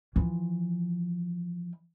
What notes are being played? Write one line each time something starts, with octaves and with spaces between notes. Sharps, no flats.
E3 F3